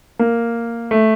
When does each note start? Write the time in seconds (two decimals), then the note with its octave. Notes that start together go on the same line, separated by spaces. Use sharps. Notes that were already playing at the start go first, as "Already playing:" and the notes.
0.19 A#3
0.91 A3